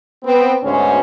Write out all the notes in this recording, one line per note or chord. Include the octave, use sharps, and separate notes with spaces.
B3 C4
D2 G#2 B2 D3 C#4 C5